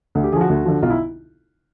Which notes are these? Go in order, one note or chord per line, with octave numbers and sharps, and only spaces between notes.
D2
G4
D3 F3 F#4 G#4
D2
D3 F3
B1 F4
E4